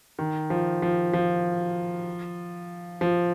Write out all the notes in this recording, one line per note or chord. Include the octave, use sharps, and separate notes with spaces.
D#3
F3
F3
F3
F3